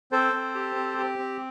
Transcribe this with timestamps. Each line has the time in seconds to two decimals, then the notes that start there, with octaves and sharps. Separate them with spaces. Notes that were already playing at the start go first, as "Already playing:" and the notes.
0.12 C4 A4 C5
0.33 C4
0.55 G4
0.76 C4
0.98 G4
1.18 C4